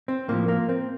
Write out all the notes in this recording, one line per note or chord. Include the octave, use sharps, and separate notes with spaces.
C4
A2 F3 A#3
A#3
C4